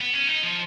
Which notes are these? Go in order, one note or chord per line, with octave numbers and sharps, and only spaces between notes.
B3
C#4
D#4
F3